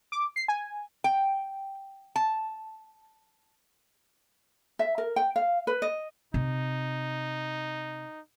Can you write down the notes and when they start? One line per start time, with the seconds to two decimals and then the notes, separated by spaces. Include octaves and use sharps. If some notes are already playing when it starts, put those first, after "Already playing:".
0.12 D6
0.36 C7
0.48 G#5
1.04 G5
2.16 A5
4.79 E5
4.98 A#4
5.16 G5
5.36 F5
5.67 B4
5.82 D#5
6.34 C3 D#4